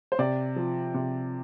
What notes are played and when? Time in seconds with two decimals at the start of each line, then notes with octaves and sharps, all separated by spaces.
0.12 C5
0.19 C3 D5
0.56 F3
0.94 C3